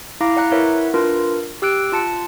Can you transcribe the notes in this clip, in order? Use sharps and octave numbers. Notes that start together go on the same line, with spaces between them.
E4 F5 A#5 D6 A#6
D5 F#5 A#5 F#6
E4 A#4 B4 C#5 E5 F#5
D4 F4 A#4 B4
G4 E6 F#6 D7
F4 A5 C#7